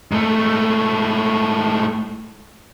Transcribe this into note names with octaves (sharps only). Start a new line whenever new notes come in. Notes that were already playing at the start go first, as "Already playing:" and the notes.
G#2 A3